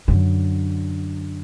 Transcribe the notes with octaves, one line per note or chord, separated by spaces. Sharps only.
F#2 D3